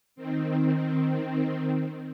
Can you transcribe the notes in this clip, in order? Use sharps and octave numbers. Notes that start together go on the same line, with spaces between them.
D#3 C4